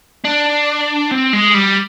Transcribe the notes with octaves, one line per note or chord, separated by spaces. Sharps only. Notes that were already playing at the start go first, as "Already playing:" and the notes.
D4
C4
G#3
G3